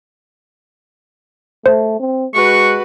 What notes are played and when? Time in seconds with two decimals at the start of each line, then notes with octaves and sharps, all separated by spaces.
1.66 A3 C5
2.00 C4
2.34 G#3 F#4 B4 C#6